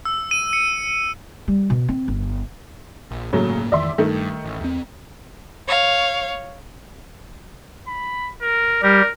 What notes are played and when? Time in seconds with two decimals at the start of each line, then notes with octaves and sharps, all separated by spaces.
0.05 E6
0.31 D#7
0.53 C#7
1.48 G3
1.70 B2
1.88 C4
2.08 G1
3.11 A#1
3.33 G1 A2 C#3 F#3 A3 A#3
3.72 F2 D#3 E3 D5 E5 C6
3.98 G2 D#3 A3
4.44 A1
4.61 E2 C4
5.68 C#5 F5
7.88 B5
8.42 A#4
8.83 G3 G4 A#4